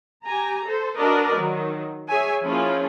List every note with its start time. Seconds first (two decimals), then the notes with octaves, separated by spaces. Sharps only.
0.24 G4 G#5 A#5
0.65 A4 C5
0.97 D4 F#4 A#4 B4 D5 D#5
1.35 D#3 F#3
2.08 G#4 C#5 E5 G#5
2.43 F3 A#3 C#4 E4 F4 G#4